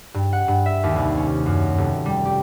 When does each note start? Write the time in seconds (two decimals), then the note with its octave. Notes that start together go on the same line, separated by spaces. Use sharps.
0.14 G2
0.33 F#5
0.48 G2
0.66 E5
0.83 D#2
0.96 C2
1.17 C#4
1.46 F#2
1.78 F1
2.06 G3
2.25 G4